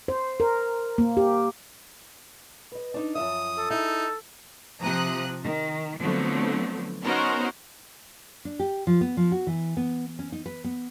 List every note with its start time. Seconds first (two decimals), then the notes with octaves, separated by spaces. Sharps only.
0.08 C5
0.40 A#4
0.98 A#3
1.17 G4
2.72 B4 D#5
2.94 D4 D#4
3.15 F#2 F3 E5 D#6
3.58 A4
3.70 D#4 E4 G#4 E5
4.82 C3 F3 A#5 D#6 F#6
5.43 D#3
6.01 D3 F3 F#3 A3 B3 C4
7.02 B3 C#4 D#4 F#4 A#4 C5
8.45 D4
8.59 G4
8.87 F3
9.01 B3
9.17 F3
9.32 F#4
9.47 E3
9.77 B3
10.19 C#4
10.32 D#4
10.46 B4
10.64 B3